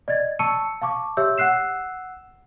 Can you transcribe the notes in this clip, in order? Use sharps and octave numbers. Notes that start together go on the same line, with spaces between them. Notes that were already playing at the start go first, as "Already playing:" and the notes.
D5 D#5 G#6 A6
A5 C#6 E6 C#7 D#7
F5 A5 C#6 D6
G4 C#5 E5 E6 G6
F#5 E6 F#6 C7 E7